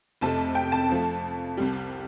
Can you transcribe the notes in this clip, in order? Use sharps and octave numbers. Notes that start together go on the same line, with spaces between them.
F1 F2 C3 A3 A5
G5
A5
F2 F3 A3
C2 C3 G3